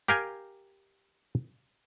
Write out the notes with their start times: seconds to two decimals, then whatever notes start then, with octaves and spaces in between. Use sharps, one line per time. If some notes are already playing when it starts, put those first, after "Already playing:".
0.08 G4 A#4 F5 G5 G#5